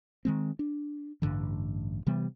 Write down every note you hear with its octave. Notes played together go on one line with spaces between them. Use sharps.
D#3 G#3 C4
D4
A1 G2 D3 D#3
C3 E3 G3 B3